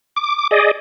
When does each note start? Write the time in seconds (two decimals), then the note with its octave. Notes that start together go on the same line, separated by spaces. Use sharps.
0.16 D6
0.51 G#4 D5 D#5